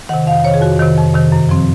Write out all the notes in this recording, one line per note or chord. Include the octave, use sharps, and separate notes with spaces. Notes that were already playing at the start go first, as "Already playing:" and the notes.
C3 D#3 F#5
F2 F5
C3 D#3 C#5
G#4
F2 F#4
C3 D#3
F2
C3 D#3
F#2
F3 C4